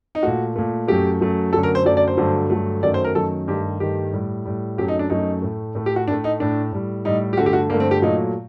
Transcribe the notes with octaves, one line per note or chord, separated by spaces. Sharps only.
D#4
A#2 A3 F#4
A#2 A3
F#2 F#3 A3 G4
F#2 F#3 A3
F#2 D3 F#3 A3 A4
A#4
C5
F#2 D3 F#3 A3 D5
D5
C5
G2 D3 F#3 A3
G2 D3 F#3 A3
F#2 D#3 F#3 A3 D5
C5
A#4
F#2 D#3 F#3 A3 A4
G2 D#3 A3 G4
G2 D#3 A3 G4
A2 G3
A2 G3
F#2 F#3 A3 G4
D#4
D4
F#2 F#3 A3 D#4
A2 A3
A2 A3
G4
F#4
A2 A3 D4
D#4
A2 A3 D4
A2 G3
A2 G3 D#4
G4
G2 D3 A3 F#4
G4
F#4
G2 D3 A3 A#3
C4
G4
A#2 F#3 A3 D#4